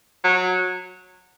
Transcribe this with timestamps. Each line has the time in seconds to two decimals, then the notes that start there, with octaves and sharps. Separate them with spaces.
0.24 F#3